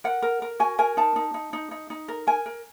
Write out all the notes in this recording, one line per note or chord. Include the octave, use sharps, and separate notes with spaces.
A#4 F#5
A#4
A#4
F#4 G#5
A#4 G#5
D#4 A5
D#4
D#4
D#4
D#4
D#4
A#4
A#4 G#5
A#4